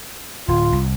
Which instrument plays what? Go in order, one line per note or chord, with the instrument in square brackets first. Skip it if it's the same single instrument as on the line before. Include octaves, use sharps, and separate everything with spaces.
[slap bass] D1 [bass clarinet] F4
[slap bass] C2